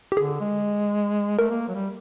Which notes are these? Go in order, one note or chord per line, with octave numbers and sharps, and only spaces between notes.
G4
D3 G#4
G#3
A3 A#4
A#3
F#3
G3